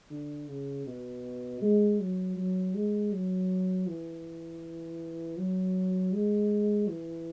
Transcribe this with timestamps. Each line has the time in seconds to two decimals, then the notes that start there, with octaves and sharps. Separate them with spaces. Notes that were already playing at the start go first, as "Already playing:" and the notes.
0.10 D3
0.48 C#3
0.87 B2
1.62 G#3
2.00 F#3
2.36 F#3
2.74 G#3
3.12 F#3
3.87 E3
5.37 F#3
6.13 G#3
6.88 E3